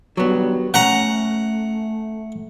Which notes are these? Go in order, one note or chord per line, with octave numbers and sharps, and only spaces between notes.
D3 D#3 F#3 G3 B3
A3 C#4 F#5 A#5